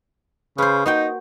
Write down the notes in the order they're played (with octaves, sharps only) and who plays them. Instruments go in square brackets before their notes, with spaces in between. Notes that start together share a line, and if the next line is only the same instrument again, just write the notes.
[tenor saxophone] C#3 [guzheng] B4 C5
[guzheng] A#3 F#4 G5 [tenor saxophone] D#4